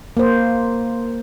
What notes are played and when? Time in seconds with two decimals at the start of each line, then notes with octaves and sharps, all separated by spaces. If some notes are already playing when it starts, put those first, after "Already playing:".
0.17 A#3 C5